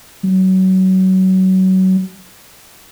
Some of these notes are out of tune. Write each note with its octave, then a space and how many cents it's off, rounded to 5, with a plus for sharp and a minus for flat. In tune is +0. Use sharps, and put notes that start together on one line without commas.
F#3 +25